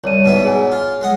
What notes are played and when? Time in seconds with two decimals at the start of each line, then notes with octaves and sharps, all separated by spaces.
0.04 C2 C#5 D5 D#7
0.24 G#2 B2 E4
0.44 G#4 C#5 G#5
0.72 F4
1.01 G#3 F#5 D#6